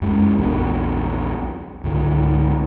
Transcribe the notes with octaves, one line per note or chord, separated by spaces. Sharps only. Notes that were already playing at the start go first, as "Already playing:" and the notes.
F#2 G#3 C#4
A#1 E2 B3 D4
C#2 G#2 D3